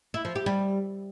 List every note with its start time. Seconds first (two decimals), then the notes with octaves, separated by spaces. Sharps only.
0.14 E4
0.25 F3
0.35 G4
0.46 G3